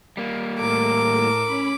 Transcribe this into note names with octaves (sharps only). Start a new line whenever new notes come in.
G3 A#3
A2 A4 A#4 D6
C#4 B5